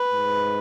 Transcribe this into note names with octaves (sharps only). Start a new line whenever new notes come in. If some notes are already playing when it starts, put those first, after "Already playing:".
Already playing: B4
G#2